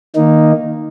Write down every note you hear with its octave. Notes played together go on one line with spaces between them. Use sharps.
D#3 A#3 D#4